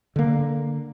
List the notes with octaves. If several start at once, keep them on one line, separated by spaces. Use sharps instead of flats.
D3 A#3